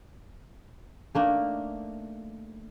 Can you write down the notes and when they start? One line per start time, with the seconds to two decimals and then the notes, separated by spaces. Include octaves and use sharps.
1.15 A3 A#3 D4 D#4